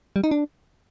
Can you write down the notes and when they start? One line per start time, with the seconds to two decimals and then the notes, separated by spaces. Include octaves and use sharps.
0.16 G3
0.24 D#4
0.31 D4